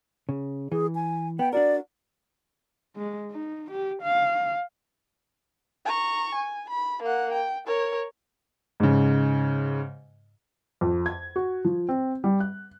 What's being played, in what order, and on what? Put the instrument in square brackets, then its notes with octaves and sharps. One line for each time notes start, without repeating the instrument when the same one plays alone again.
[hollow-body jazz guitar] C#3
[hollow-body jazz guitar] E3 [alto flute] G#4
[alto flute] G#5
[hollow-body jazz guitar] B3 [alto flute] G5
[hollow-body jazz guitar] D4 F#4 A#4 [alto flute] D5
[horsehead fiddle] G#3
D#4
G4
F5
[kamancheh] A#5 C#6
G#5
B5
A#3 F#5
G5
A#4 C#5
[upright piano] G#2 C#3
[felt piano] F2
G#6
F#4
F3
C4
G3
F#6